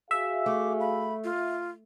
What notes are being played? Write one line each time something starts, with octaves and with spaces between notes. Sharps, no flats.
F#4 G#4 E5 F5
A3 D6
B5
F4